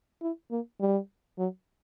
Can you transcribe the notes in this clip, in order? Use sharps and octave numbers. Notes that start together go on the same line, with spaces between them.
E4
A#3
G3
F#3